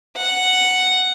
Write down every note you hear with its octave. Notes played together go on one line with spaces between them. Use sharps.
F#5